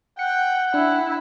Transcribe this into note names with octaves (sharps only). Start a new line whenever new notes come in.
F#5 G5 C#7
D4 E4